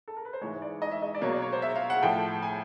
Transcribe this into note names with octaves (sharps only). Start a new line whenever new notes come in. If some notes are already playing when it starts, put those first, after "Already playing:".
A4
A#4
B4
C5
G#2 E3 G#3 C#5
D5
D#5
E5
D#5
D5
B2 F#3 A#3 C#5
D5
C#5
C5
E5
F5
F#5
A2 F3 A3 G5
G#5